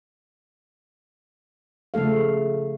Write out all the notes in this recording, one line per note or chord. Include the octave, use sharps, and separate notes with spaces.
C#3 F3 A3 A4 F5